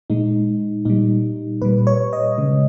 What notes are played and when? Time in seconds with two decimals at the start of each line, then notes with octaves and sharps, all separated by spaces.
0.10 A#2 G#3 D#4
0.85 A#2 G3 D#4
1.62 A#2 G3 B4
1.87 C#5
2.13 D#5
2.38 C#3 G#3